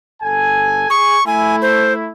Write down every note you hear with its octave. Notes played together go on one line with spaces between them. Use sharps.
G1 A4 G#5
G#4 C#6
A3 E4 G#5
C5